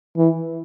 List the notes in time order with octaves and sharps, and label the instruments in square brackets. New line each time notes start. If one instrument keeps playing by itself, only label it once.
[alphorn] E3